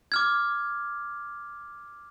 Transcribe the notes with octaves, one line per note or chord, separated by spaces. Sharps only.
D6 F6 G#6